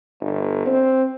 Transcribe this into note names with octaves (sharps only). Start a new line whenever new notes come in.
G1
C4